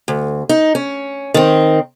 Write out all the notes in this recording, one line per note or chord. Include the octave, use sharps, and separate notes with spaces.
D2
D#4
C#4
D#3 C4